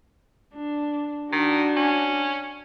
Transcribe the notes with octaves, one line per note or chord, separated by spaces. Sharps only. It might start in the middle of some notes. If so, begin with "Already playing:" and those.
D4
D#3 D4 F#4
C#4